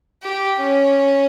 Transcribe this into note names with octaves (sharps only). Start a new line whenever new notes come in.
G4
C#4